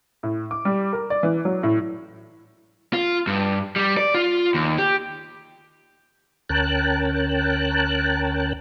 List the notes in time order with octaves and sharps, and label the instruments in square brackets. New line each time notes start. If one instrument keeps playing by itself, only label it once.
[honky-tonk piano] A2
D6
G3
A#4
D5
E3
F#3
A2
[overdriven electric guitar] F4
G2
G3
D5
F4
D#2
G4
[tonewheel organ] D2 C#4 A#4 G5 A5 F#6